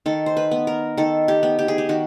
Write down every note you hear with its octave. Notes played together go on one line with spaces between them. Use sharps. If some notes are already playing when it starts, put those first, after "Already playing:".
D#3 A4
C5
B4
B3
A#4
D#3 A4
G4
B3
G4
G#4
G4
D#3 F#4